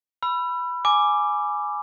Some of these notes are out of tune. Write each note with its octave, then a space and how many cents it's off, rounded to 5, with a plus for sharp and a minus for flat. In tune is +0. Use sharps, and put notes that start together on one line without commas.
B5 +0 E6 +35
G#5 +5 D6 +0